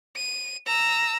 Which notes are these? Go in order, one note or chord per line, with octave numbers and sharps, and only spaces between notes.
D#7
A#5 E6